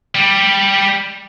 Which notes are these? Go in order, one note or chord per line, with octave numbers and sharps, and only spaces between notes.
G3